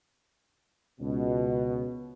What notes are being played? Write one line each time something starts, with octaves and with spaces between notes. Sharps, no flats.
C#2 B2